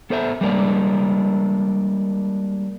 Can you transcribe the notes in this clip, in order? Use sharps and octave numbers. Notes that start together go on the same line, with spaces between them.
B3 A4 C5 D5 E5
G3 G#3 A#3 D4